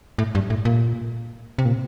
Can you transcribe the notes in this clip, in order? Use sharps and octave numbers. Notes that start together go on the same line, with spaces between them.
A2
G2
A2
A#2
C3
A#2